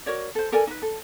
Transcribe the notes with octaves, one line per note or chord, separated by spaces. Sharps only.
F#4 A#4 C#5 D5
A4 C5
A4 A#4 D5 G#5
D#4 B4
A4